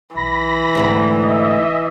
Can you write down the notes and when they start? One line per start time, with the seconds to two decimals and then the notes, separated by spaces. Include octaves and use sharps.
0.15 B1 E3 B5 A#6
0.75 F1 D2 G#2 B3 C4
1.22 D#5 E5